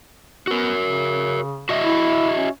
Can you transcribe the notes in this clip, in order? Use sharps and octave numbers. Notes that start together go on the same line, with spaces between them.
B3 F#4 A#4
C#3
F#4 D#5 E5
E4
C#4